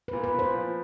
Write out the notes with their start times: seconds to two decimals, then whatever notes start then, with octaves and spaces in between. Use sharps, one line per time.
0.08 A#2 B4
0.24 B4
0.34 A#2 C5
0.54 F3